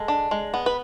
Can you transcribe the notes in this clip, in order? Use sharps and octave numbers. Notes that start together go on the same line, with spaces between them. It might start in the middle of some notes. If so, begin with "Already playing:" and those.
Already playing: G#3 A4
D4
G#3
B3
B4